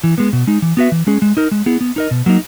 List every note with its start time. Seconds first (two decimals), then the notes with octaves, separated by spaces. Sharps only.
0.04 E3
0.18 G#3 B3
0.33 B2
0.47 G#3 D#4
0.62 E3
0.77 B3 F#4 B4 E5
0.92 E3
1.07 G#3 C#4 G#4
1.22 G#3
1.37 D#4 A#4
1.51 G#3
1.66 B3 E4 G#4
1.81 B3
1.96 D#4 A#4 D#5
2.11 B2
2.26 F#3 A#3 D#4